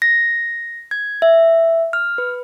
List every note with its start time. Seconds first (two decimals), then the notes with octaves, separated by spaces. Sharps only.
0.02 A#6
0.91 G#6
1.22 E5
1.93 F6
2.18 B4